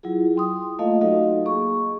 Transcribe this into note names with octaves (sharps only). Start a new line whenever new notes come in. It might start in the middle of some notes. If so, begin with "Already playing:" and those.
F#3 E4 F4 G#4
G5 C6 D#6
A3 A#3 F4 A4 D#5 F5
F#3 D#4 F#4 A4 D#5 F5
A#3 G#4 C#6